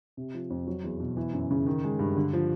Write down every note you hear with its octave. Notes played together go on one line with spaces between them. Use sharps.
C3
F3
F2
F#3
E2
B2
E3
F#2
C#3
D#3
G#3
G2
D3
F3